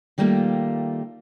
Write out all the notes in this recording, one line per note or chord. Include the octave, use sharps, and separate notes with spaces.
D#3 G3 A3 A#3 F4